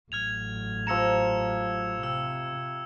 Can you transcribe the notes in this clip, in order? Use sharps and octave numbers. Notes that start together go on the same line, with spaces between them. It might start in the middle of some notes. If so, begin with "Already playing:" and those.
A1 F#3 F6 G#6 F7
F3 G4 A#5 E6 C#7 E7
C3 G5 E6